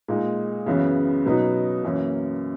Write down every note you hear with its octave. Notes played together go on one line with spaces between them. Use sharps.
A#2 G#3 D#4
F#2 C#3 E3 B3
B2 F#3 B3 D#4
F#2 E3 A#3